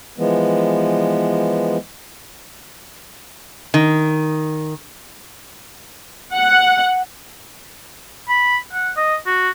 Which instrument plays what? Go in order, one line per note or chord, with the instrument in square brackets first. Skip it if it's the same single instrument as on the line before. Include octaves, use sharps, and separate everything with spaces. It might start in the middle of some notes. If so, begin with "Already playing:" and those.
[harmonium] E3 F3 G#3 B3
[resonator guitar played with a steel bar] D#3
[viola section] F#5
[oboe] B5
F#5
D#5
F#4